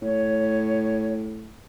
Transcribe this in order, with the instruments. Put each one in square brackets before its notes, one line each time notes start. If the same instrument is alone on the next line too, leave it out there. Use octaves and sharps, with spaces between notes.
[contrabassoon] A2 [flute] C#5